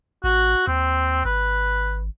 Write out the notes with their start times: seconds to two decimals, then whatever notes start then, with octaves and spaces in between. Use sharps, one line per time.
0.24 A1 F#4
0.67 D#2 C4
1.25 G#1 B4